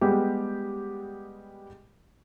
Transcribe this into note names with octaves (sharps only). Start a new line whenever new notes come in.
G3 G#3 B3 G4